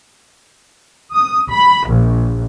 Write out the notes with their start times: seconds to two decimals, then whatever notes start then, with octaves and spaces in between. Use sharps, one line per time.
1.13 D#6
1.50 B5
1.88 A#1